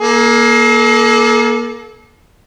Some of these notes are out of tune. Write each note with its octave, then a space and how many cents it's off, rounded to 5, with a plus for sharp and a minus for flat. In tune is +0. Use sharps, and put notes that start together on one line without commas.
A#3 +25 A4 -35